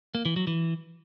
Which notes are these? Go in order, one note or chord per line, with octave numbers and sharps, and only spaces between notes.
A#3
E3
F#3
E3